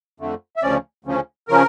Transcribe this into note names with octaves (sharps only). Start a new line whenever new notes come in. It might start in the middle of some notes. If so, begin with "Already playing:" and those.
F2 D3 A3
E5
D2 C#3 F3 C#4 D5
D2 C#3 F3 C#4
C#3 F3 C#4 A#4